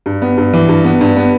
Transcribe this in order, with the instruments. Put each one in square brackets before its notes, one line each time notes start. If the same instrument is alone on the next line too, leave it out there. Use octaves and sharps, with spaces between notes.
[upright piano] G2
B3
G2
E3
G2
B3
G2
B3